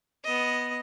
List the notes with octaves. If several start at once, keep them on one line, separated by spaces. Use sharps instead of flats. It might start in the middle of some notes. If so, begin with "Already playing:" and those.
B3 D#5